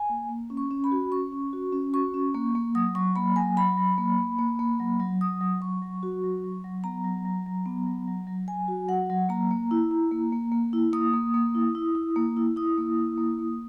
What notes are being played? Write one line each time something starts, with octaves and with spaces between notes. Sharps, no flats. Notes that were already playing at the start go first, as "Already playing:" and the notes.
Already playing: G#5
A#3
A#3
C#4
C#6
C#4
B5
F#4
C#4 C#6
C#4
F#4
C#4
F#4 C#6
C#4
A#3
A#3
F#3 D#6
F#3 C#6
A#3 B5
F#3 G#5
F#3 B5
F#3
A#3
A#3
A#3
A#3
F#3
F#3
F#3 D#6
F#3
F#3 C#6
F#3
F#4
F#3
F#3
F#3
B3 A#5
F#3
F#3
F#3
B3
F#3
F#3
F#3
F#3 G#5
F#4
F#3 F#5
F#3
A#3 A#5
A#3
E4
E4
A#3
A#3
A#3
E4
A#3 D#6
A#3
A#3
E4
E4
E4
A#3
E4
E4 D#6
A#3
E4
A#3
A#3